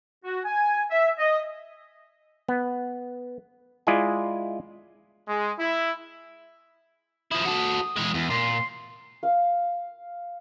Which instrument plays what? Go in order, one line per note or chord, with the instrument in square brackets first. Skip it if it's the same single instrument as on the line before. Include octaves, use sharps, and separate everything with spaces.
[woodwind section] F#4
G#5
E5
D#5
[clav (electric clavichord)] B3
G#3 E4 F4 D5 D#5 G#5
[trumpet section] G#3
E4
[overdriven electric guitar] F3 E4 [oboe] D#6
[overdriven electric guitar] F#4 A4
E3 G#3
E2
[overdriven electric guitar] A#2 [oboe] C6
[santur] F5